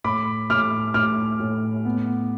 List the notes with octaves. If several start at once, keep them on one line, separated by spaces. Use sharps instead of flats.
A2 B5 D6
A2 D6 F6
A2 D6 F6
A2
B3